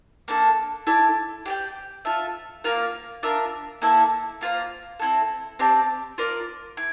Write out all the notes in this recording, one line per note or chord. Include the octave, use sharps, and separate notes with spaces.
A#3 D4 A4
E4 A4 D5
G4 D5 G5
F4 A4 E5
A#3 F4 A#4 F5
D4 F4 A#4 E5
A#3 E4 A4 E5
A#3 F4 C5
C4 E4 A4
C4 G4 D5 A5
F4 A#4 D5
E4